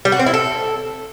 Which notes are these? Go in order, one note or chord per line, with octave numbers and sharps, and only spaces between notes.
G3
F#4
C4
E4
A4